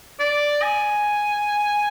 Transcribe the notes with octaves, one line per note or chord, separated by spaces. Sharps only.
D5
G#5